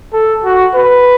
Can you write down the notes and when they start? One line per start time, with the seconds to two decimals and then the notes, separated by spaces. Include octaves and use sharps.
0.13 A4
0.44 F#4
0.74 B4